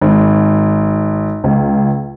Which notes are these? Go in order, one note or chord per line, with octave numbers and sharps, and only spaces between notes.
G#1
C#2